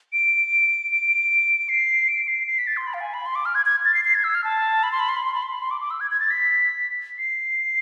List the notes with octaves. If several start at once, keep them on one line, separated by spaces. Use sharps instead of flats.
D7
D7
C7
D7
C7
C7
B6
A6
C6
B5
F5
G#5
B5
C6
D6
F6
G#6
G#6
A6
C7
C7
G#6
E6
F6
A5
B5
C6
B5
C6
B5
C6
B5
C6
B5
C6
D6
D6
E6
G#6
G#6
A6
B6
C7